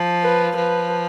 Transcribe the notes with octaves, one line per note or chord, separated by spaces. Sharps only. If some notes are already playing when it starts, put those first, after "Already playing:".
Already playing: F3
B4
F3 B4